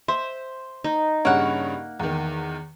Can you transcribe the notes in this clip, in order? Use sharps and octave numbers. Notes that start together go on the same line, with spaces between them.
C5 E5
D#4
G2 C#3 A#3 C#5 F#5
E2 D#3